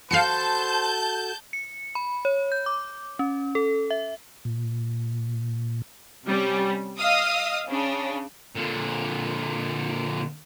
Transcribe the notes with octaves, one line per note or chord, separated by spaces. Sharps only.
F#4 A4 C5 F5 A5 G6 C7 C#7
C#7
B5
C#5
G6
D6
C#4
A4
E5
A#2
C3 G3 C#4
D#5 F5 D#6 E6
C#3 D4
A#2 D3